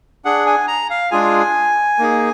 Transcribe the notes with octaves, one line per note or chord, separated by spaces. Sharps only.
D4 G#4 F#5
G#5
A#5
F5
G#3 D4 F4 G#4 G#5
A#3 D#4 G#4